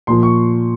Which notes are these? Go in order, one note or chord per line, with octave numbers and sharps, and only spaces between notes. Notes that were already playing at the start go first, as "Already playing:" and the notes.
A#2 F3 C6
C#6